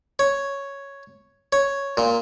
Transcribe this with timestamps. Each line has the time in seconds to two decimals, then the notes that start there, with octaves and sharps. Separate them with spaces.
0.19 C#5
1.53 C#5
1.97 A#2